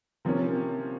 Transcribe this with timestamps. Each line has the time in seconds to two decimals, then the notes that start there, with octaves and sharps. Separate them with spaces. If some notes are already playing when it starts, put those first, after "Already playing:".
0.25 C3 F3 A#3 C#4